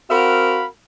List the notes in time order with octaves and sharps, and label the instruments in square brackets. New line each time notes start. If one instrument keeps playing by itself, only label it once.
[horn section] C4 F#4 A#4 F5 F#5 B5